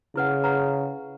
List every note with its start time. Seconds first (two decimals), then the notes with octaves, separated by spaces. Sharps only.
0.16 C#3 E4 B4 F#5
0.44 B4 F#5 A#5